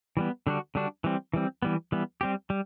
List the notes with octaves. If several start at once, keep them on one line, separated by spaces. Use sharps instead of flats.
E3 G3 B3
D3 G3 D4 F#4
D3 G3 D4 F#4
E3 G3 C4
E3 G3 C4
E3 G3 B3
E3 G3 B3
G3 C4 G4
G3